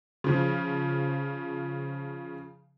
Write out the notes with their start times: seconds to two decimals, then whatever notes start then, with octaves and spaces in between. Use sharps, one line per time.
0.24 C#3 F3